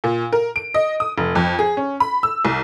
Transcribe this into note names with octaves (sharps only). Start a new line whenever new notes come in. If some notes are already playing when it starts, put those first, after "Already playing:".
A#2
A#4
D7
D#5
D#6
F1
F2
G#4
C#4
B5
E6
C2